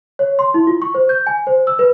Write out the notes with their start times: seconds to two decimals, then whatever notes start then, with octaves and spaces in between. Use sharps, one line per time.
0.19 C#5
0.39 C6
0.54 E4
0.67 F4
0.82 C#6
0.95 C5
1.09 G6
1.27 G#5
1.47 C5
1.67 E6
1.79 B4